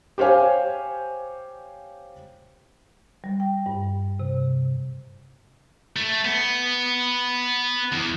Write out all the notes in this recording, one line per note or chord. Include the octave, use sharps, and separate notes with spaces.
G4 C5 C#5 F5 G#5
G3
G5
G2
C3
A3
B3
E2